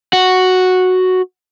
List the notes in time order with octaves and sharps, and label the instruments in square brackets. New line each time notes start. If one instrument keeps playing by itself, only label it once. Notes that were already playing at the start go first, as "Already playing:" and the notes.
[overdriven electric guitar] F#4